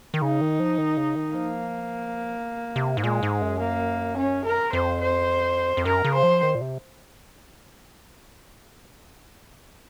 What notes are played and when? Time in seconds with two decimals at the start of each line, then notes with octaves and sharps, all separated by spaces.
0.14 D#3
0.22 C#3 D#4
0.41 D#3
0.60 F3
0.78 D#3
0.97 C#3
1.16 D#3
1.34 F3 A#3
2.76 C3
2.97 G#2
3.04 A#2 G#3
3.23 G#2
3.42 F#2
3.61 A#3
4.17 C#4
4.45 A#4
4.73 F2 C5
5.02 C5
5.77 F2
5.85 F#2 A#4
6.04 C#3
6.14 C5
6.23 F3
6.43 D#3
6.55 A#2
6.61 C3